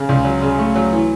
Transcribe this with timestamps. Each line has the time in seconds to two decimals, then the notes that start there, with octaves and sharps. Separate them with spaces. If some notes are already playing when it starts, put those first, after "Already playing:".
Already playing: C#3
0.09 C#2
0.25 F#3
0.42 C#3
0.58 A3
0.76 F#3
0.92 E3